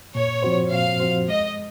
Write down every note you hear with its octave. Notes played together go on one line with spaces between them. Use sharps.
A#2 C#5
F3 C4 F#4 C5
A#2 F5
F3 C4 F#4 C5
G#3 D#5